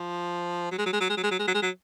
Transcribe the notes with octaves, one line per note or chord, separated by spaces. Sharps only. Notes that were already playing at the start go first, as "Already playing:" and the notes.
Already playing: F3
F#3
G#3
F#3
G#3
F#3
G#3
F#3
G#3
F#3
G#3
F#3
G#3
F#3